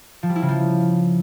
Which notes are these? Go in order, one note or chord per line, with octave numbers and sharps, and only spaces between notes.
F3
G3
E4
C#3
F3